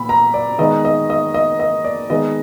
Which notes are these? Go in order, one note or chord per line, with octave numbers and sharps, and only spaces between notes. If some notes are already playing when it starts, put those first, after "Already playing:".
Already playing: A#2 B5
A#5
D5
D#3 G#3 B3 D#5
D#5
D#5
D#5
D#5
D5
D#3 G#3 B3 D#5